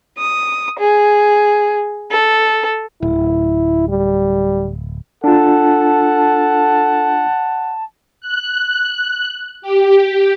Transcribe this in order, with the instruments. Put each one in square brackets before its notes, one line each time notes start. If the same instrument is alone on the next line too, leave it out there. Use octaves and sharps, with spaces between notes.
[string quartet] D#6
G#4
A4
[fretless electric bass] D1 [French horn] E4
[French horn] G3
[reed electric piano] D4 F4 [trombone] A4 [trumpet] F#5 [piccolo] A5
[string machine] F#6
G4